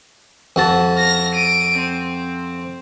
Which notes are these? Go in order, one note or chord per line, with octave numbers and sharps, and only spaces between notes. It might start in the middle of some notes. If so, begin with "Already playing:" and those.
F2 F#4 A5
F6 A#6
D7 D#7
C4